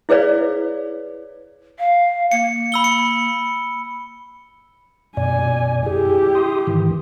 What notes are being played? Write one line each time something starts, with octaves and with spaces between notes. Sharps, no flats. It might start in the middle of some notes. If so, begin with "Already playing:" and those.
E4 G#4 B4 C#5 D5 F5
F5
A#3 C#7
B5 E6 G7
C#7
F#2 B2 D5 G#5
E4 G4 G#4
C6 D#6
G#2 D#3 E3